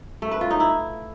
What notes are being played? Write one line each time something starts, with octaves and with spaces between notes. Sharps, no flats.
A3
B4
F4
D#4
E4